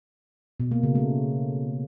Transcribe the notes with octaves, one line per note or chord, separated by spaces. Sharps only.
B2
A#3
C#3
A3